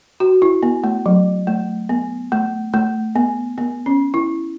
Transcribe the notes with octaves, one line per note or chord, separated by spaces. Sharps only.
F#4
E4
B3
A3
F#3
A3
B3
A3
A3
B3
B3
C#4
E4